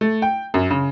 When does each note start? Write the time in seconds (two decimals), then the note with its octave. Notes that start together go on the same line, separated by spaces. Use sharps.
0.01 A3
0.22 G5
0.54 F#2
0.70 C#3